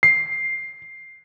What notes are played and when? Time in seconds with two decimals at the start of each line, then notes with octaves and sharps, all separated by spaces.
0.03 C7